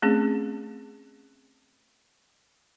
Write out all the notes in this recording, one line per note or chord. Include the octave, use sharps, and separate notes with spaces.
A3 C4 C#4 G#4